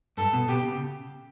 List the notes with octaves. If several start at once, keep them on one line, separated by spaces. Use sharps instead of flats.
G2 A4
B2
B2 G4
C#3